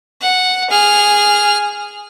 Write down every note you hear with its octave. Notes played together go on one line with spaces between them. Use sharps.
F#5
G#4 F6